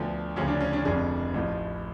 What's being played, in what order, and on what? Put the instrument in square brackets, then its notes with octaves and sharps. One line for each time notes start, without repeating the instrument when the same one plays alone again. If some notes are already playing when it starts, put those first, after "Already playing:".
Already playing: [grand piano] D2 D3 F3 B3
D2 C#3 F3 C#4
D4
C#4
D4
F1 F2 D3 F3 G#4
A1 A2 F3